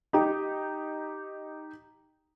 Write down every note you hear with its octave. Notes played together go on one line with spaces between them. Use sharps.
D#4 G4